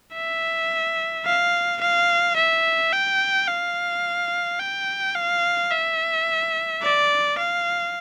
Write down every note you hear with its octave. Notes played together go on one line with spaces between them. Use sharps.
E5
F5
F5
E5
G5
F5
G5
F5
E5
D5
F5